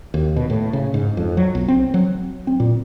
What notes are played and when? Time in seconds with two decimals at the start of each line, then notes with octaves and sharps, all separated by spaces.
0.14 D#2
0.36 B2
0.50 A2
0.73 C#3
0.94 G#2
1.17 F2
1.37 F#3
1.55 B1
1.68 C4
1.94 F#3
2.47 C4
2.60 A#2